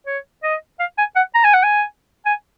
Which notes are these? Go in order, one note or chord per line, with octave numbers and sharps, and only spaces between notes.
C#5
D#5
F5
G#5
F#5
A#5
G#5
F#5
G#5
G#5